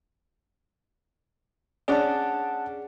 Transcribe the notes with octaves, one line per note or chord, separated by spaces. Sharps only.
C#4 D4 G#4 F#5 A5